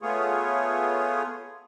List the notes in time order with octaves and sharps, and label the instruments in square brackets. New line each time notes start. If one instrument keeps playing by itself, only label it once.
[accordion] A3 B3 F4 G#4 C#5